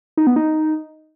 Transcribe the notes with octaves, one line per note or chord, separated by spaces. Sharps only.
D#4
B3
D#4